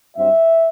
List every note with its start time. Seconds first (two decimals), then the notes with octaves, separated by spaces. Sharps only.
0.16 G2 F#3 C4 E5